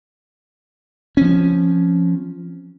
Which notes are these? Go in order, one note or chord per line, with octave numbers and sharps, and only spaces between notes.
F3 C4 C#4